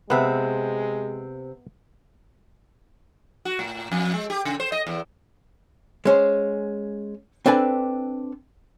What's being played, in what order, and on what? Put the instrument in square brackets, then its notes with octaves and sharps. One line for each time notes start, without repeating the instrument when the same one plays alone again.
[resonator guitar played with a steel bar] C3 C4 [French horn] G#3 [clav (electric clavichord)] B3 B4 E5
[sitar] F#4
A2
F2
G#3
G4
C#3
C5
D#5
E2
[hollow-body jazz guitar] G#3 C#4 C5
C4 D4 A4 B4 G#5